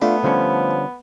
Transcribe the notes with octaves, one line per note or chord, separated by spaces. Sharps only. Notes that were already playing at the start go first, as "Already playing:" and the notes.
A3 B3 D4 F4
D3 F3 G3 C#4